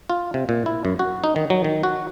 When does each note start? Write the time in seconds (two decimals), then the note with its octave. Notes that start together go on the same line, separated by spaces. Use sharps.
0.10 F4
0.34 C3
0.49 A#2
0.66 E4
0.85 F#2
0.99 F#4
1.24 D#4
1.36 D#3
1.50 F#3
1.64 D#3
1.83 F#4